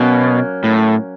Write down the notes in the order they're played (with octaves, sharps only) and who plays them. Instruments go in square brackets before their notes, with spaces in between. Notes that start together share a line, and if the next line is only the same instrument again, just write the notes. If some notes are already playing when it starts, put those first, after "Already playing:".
Already playing: [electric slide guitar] B2 [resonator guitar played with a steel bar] F#3 A#3 C#4
[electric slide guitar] A2